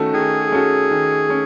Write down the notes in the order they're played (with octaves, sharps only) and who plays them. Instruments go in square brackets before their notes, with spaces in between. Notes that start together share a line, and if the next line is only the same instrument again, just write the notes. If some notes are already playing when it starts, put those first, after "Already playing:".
Already playing: [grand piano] D#3 A3 C#4 F#4 A4
[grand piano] D#3 [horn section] G#4
[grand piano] A3 C#4 F#4 A4
D#3
A3 C#4